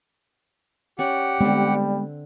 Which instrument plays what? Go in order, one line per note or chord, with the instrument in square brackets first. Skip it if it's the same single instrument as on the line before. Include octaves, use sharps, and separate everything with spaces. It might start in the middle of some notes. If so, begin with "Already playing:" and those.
[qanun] C#4 D5 C#6 [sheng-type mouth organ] G4 F#5
[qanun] D3 C4 [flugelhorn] G3 [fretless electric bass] G#3 B3